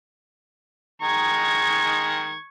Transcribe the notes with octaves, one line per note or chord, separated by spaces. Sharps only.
D#3 G#3 A#5 C#6 G#6